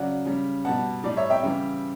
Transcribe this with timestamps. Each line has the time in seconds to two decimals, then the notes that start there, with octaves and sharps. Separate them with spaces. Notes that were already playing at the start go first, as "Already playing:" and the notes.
Already playing: C#3 F#3 D5 F#5
0.25 C#3 G3
0.65 B2 G3 F#5 A5
1.04 A2 G3 D5
1.17 C#5 E5
1.30 E5 G5
1.43 C#3 E3 G3